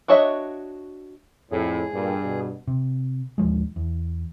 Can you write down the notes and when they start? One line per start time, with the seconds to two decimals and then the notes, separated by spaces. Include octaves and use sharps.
0.08 D4 F#4 C#5 D#5 E5
1.52 F2 A2 G#4
1.93 G2 A#2
2.23 B2
2.67 C3
3.38 A#1 D#2 F3 G#3
3.76 E2